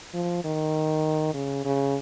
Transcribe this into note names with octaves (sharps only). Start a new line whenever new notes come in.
F3
D#3
C#3
C#3